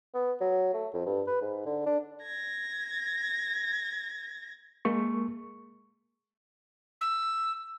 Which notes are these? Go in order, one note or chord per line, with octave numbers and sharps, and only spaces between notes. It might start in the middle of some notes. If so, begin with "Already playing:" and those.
B3
F#3
A3
F2
G2
B4
G#2
D3
D4
G#6 A#6
G#3 A#3 C#6
E6